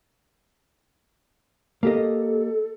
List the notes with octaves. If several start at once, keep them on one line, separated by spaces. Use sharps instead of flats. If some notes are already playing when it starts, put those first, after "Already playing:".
A#3 G4 A4 D#5